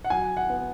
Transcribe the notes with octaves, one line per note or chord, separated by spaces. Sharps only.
F#5
F#3 G#5
F#5
B3